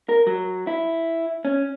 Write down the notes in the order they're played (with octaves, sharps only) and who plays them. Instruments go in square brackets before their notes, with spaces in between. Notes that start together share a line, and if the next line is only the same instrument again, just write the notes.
[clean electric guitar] A#4
F#3
E4
C#4